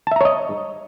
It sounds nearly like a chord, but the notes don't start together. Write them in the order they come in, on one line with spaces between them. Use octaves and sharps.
A5 E5 A#5 C#5 D#5